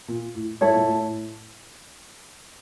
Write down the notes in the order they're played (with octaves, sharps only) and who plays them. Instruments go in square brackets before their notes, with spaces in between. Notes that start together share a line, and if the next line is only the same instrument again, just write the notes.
[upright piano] A#2
A2
[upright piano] G#2 [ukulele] E4 A4 C#5
[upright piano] A#2
A2
A2